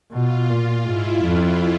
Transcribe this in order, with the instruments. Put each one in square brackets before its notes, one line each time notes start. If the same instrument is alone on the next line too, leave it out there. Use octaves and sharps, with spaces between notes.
[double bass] B2 [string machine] F4
[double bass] A#2
[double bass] G#2 [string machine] E4
[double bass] F2